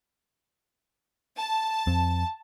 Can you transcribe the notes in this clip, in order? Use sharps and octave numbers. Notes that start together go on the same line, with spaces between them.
A5
F2 C4